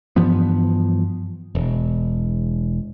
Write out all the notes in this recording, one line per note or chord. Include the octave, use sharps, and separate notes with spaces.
G2 E3 F3 B3
E1